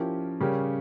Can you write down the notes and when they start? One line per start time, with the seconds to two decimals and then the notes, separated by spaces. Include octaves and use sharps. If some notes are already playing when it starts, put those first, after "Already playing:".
Already playing: F3 C#4 E4 G4 A#4
0.40 C#3 G3 C#4 G4 A#4